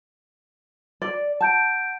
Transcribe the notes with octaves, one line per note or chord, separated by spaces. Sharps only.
D5
F#5 A5 G6 D7